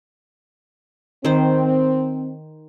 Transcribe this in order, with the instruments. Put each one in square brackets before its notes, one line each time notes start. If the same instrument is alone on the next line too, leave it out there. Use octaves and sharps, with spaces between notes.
[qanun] D#3 C5 [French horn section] C4